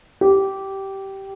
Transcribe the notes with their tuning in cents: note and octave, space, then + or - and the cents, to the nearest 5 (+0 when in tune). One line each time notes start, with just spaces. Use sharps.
G4 -15